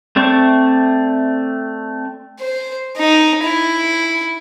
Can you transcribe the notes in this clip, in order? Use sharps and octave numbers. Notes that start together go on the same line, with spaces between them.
A3 C4 D5 C#6
C5
D#4
E4